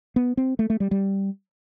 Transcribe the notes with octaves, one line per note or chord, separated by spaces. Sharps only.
B3
C4
A3
A3
G3
G3